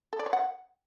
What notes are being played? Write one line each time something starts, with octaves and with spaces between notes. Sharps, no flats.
A4
D5
C#5
F#5